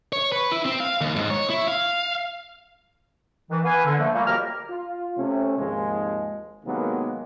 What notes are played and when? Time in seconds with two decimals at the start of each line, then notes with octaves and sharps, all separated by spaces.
0.13 C#5
0.32 B4
0.52 E4
0.66 C4
0.80 F5
1.01 D#2
1.16 G#2
1.30 C#5
1.50 E4
1.68 F5
3.50 D#3 E3
3.64 B3 B4 F5 G#5
3.84 D3
3.99 D3 F3 A3 A#3
4.14 A#2 F3 G3 A3 A#3
4.27 F2 F#3 G4 A#4 A#5 F6
4.70 F4
5.18 C3 A3 C#4
5.58 G#1 D#2 F3 G#3
6.66 C3 D#3 F#3 G#3 A#3 B3